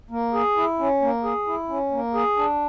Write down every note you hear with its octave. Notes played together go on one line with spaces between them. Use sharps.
A#3
G#4
E4
C#4
A#3
G#4
E4
C#4
A#3
G#4
D4